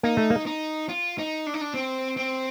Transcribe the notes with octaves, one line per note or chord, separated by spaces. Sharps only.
A#3 D#4
A3
A#3
D#4
F4
D#4
D4
D#4
D4
C4
C4